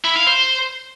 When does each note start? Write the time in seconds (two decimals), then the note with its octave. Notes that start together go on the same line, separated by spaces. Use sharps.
0.05 E4
0.16 F5
0.27 C5